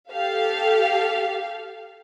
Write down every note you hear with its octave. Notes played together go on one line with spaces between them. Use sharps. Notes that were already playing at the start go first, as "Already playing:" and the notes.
G4 A4 F5